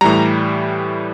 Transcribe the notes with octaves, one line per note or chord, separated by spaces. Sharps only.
A2 E3 G3 A#5